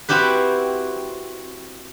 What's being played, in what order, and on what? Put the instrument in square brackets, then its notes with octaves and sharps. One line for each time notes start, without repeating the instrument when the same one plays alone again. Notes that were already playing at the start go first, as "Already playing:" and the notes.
[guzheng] C4 E4 F#4 G4 B4